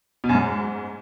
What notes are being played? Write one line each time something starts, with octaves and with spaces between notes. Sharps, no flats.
B2
F#2
G#2